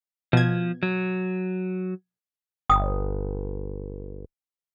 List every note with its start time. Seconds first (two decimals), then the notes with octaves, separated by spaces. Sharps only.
0.33 B2 F3 G#6
0.83 F#3
2.70 G1 G5 D#6